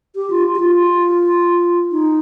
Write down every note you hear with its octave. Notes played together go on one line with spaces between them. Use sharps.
G4
F4
G4
F4
D#4